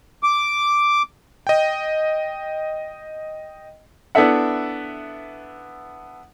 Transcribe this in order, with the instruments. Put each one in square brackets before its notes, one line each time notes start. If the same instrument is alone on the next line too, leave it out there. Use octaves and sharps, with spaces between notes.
[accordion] D6
[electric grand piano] D#5 G5
[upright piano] B3 D4 E4 A4 E5 F#5